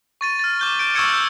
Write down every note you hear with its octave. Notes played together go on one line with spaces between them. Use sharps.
C#6 A6 D#7
F6 A6
D6 G6 G7
G6 D7
C#6 E6 F6 G#6 C#7 E7
E6 G6